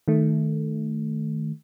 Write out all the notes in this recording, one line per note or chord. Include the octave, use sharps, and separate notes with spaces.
D#3 A3